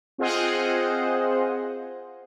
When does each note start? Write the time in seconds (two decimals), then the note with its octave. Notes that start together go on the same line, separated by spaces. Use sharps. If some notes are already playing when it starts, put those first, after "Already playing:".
0.18 C4 F4 G#4 C5 D#5 F#5